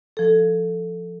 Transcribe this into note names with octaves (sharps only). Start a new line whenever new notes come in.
F3 A4